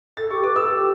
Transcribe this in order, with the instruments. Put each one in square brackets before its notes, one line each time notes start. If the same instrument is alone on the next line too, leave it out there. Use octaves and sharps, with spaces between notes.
[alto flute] A4 [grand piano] A6
[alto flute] G4 [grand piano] C#6
[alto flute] B4 [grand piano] D6
[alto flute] A4 [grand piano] E6
[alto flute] G4